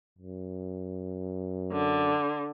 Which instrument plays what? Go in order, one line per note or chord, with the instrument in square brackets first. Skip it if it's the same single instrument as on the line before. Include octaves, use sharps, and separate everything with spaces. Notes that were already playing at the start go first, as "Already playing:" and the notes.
[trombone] F#2
[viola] D3